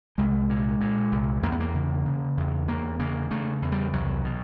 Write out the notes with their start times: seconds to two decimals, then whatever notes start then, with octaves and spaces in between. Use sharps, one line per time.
0.18 C2 G#3
0.50 A#2
0.81 A#2
1.12 C2
1.43 E2 A#3
1.52 B3
1.60 A#3
1.74 C#3
2.06 C#3
2.37 E2
2.68 E2 A#3
2.99 C#3 A#3
3.31 C#3 A3
3.62 E2
3.72 G3
3.93 C2 F#3
4.25 B2